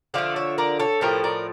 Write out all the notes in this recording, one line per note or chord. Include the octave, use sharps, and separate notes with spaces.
D3 F3 A3 D5 F5
C#5 E5
A#4 D5
A4 C#5
A2 F3 A3 G4 A#4
A#4 D5